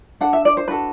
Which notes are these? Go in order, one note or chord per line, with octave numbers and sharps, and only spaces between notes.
D4 A4 F#5
E5
D5
C5
D4 F#4 A4 B4